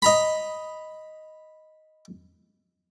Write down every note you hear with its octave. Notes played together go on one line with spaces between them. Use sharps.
D#5 A#5 B5